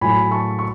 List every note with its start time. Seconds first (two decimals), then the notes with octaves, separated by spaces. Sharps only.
0.01 A2 F#3 G#5 B5
0.31 A5 C#6
0.59 C#6